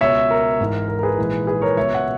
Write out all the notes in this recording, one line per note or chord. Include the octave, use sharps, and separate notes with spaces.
C#2 B2 C#5 E5
A#4
G#1 G#2 E3
A#4
A#4
G#4 B4
A#1 G#2 E3
G#4 B4
A#4 C#5
C#2 B2 C#5 E5
F#5